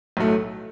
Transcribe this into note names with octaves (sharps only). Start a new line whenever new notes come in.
B1 A2 F#3 A3